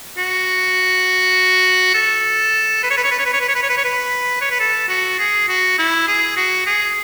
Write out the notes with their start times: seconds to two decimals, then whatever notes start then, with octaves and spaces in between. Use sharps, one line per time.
0.18 F#4
1.94 A4
2.83 B4
2.90 C#5
2.97 B4
3.04 C#5
3.11 B4
3.19 C#5
3.26 B4
3.34 C#5
3.41 B4
3.48 C#5
3.55 B4
3.63 C#5
3.69 B4
3.77 C#5
3.85 B4
4.41 C#5
4.51 B4
4.60 A4
4.89 F#4
5.19 G#4
5.49 F#4
5.78 E4
6.08 G#4
6.37 F#4
6.66 G#4